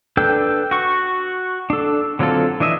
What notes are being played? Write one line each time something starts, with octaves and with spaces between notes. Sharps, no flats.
D4 A4 B4 G5
F#4 C#6
D4 A4
D3 F#3 C4 F4 A4
E3 D4 D#5 E5